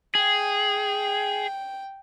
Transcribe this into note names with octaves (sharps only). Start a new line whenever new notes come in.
G#4 G5